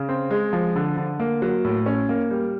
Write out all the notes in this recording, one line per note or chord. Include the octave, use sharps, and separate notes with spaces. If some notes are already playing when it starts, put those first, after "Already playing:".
Already playing: C#3
C4
G#3
F3
D3
D3
A#3
F#3
A2
C#4
A#3
G3